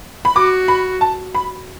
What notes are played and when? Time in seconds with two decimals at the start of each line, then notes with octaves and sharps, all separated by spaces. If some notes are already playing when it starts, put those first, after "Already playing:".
0.25 B5
0.35 F#4 D6
0.68 B5
1.01 A5
1.35 B5